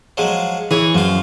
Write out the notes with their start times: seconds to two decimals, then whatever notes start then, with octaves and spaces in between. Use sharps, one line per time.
0.17 F3 F#3 G#3
0.71 E3 G#4 C#5
0.95 F#2 F3 F4